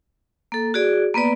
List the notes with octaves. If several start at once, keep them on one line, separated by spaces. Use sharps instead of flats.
A#3 A4
F#4 G#4 D5
A#3 B3 B4 D5